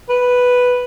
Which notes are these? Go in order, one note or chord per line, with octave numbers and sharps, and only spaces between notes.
B4